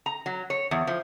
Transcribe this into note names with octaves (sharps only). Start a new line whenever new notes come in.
A#5
F#3
C#5
E2
F3